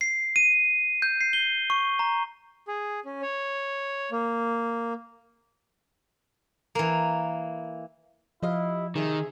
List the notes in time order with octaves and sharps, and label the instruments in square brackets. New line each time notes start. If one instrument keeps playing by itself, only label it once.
[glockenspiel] C7
D#7
G6
C7
G7
C#6
A#5
[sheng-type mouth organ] G#4
C#4
C#5
A#3
[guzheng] E3 A#3
[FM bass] F3 [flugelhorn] E4 [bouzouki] G4 D#5 F5
[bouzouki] C3 E5 [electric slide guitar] D#3 [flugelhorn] G#4